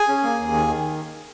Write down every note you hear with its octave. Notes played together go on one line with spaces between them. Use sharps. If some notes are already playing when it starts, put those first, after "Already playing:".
Already playing: G#4 G#5
C#4
A#3
D#2
D#3
D#3